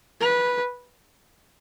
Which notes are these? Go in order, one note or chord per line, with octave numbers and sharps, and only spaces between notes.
B4